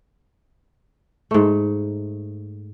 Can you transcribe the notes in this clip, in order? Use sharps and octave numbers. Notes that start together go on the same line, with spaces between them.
G#2 A3